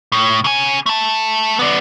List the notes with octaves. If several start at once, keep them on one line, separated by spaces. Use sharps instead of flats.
A2
C#3 G#5
A3 A5
B3 D5